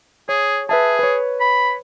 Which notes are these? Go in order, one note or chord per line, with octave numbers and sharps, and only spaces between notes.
G#4 C#5
G#4 B4 E5 A5
B4 C#5
B5